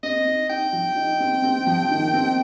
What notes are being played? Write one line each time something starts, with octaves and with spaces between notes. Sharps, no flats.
C4 D#5
D#4
D#4 G5
F3
D#4
C4
C4
F3
D#3
C4